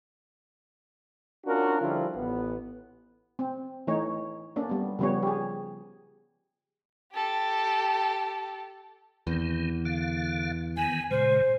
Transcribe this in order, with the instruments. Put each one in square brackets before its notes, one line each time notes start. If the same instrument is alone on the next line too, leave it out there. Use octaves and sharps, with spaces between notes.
[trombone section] C#4 D4 F4 F#4 A#4
D3 F3 G3 E4 F4
A1 B3
[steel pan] C4
E3 A3 D#4 C#5
A#3 C#4 D4
G3 B3
C#3 F3 G3 B3 C#5
G4 G#4
[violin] G4 A4
[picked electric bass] E2 [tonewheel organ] D#3 C4
[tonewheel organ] D3 F5
[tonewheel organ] D#3 E3 B3 [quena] G#5
[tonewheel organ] A#2 C#3 G#3 [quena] C5